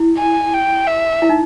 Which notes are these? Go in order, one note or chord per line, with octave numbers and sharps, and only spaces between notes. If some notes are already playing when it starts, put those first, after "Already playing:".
Already playing: E4
G#5
G5
E5
E4
D#4